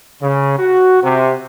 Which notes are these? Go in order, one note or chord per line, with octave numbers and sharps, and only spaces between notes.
C#3
F#4
C3